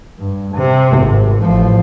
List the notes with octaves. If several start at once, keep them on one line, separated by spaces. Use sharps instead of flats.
G2
C3
G#1
A1 F3